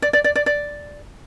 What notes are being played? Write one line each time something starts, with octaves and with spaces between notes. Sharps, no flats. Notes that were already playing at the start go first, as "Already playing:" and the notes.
D5
D5
D5
D5
D5